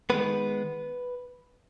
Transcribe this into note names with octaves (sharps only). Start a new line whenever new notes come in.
D#3 G#3 B3 B4